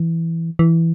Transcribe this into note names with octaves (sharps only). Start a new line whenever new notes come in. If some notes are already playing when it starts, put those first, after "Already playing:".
Already playing: E3
E3